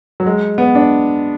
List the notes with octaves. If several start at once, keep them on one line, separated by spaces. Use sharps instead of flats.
F#3
G#3
B3
D4